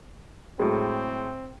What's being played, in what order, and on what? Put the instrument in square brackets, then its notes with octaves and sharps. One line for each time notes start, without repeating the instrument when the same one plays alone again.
[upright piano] A2 F#3 G#3 [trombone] C4